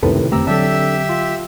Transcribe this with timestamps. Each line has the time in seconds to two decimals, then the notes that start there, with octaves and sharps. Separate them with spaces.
0.03 C#2 F#2 A2 C3 D#3 A4 B4
0.32 F2 D3 A3 C4 G4 A#5 E6
0.47 D3 F#3 D4 G4 A4 E5 E6
1.09 F4